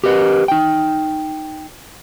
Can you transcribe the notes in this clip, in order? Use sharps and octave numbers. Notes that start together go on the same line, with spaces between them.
G4 A#4 B4 D#5
D#4 G5